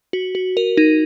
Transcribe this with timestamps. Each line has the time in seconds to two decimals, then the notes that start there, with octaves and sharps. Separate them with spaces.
0.13 F#4
0.35 F#4
0.57 A#4
0.77 D#4